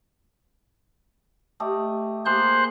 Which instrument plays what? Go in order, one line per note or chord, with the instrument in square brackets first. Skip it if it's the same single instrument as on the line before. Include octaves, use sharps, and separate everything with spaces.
[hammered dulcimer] A3 G4 D#5
[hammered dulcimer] A#3 G#4 [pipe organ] C5 C6 F#6